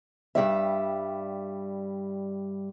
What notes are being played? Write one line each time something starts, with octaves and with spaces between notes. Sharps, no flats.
G2 C#3 G3 E5